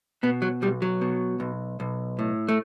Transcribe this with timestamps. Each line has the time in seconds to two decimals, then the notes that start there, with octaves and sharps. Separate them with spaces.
0.23 B2 B3
0.42 F#3
0.62 B1 G3
0.82 F#3
1.01 B2
1.40 B1
1.80 B1
2.19 A2
2.48 A3